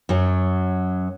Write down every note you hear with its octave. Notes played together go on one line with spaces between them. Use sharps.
F#2 F#3